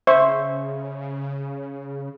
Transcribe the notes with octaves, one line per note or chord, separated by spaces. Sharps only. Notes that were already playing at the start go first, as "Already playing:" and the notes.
C#3 C5 E5 C#6